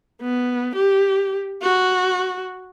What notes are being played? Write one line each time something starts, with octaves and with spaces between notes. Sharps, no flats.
B3
G4
F#4